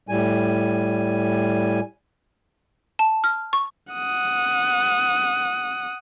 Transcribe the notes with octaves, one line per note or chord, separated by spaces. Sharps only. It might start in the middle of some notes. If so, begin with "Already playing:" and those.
A2 G3 G#5
A5
F6
C#6
F#5 D#6